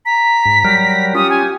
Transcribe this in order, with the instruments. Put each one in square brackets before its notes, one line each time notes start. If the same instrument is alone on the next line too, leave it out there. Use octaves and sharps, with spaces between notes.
[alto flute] A#5 [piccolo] B6
[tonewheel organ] G#2
F#3 G3 A#4
[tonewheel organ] C#4 F4 [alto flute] G4 [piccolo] D#6
[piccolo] G#5